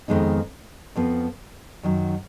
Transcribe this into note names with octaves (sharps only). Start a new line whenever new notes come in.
F2 D#3 G#3 B3 D#4
F2 F3 B3
F#2 D#3 F#3